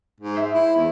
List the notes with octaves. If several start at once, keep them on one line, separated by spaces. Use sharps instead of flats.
G#2
C5 E5
E4
E2